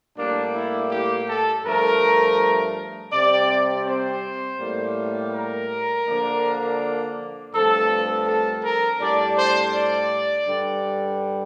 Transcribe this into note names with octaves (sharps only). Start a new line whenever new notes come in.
A2 G3 A#3 D4
E4
G4
A4
G2 F3 A3 A#4
C3 G3 C4 D5
C5
A2 G3 A#3
A#4
D3 F3 A#3 D4
G2 F3 A3 C4 A4
A4
A#4
A2 G3 D4 D5
C5
D5
G2 D3 G3